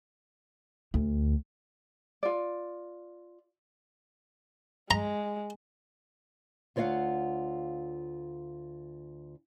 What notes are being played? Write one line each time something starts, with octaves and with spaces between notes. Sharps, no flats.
D2
F4 D5
G#3 A#5
D2 F4 C#5 D5 F5 F#5